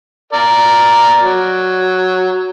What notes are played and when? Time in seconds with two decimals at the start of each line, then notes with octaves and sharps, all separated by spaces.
0.33 A#4 D5
1.22 F#3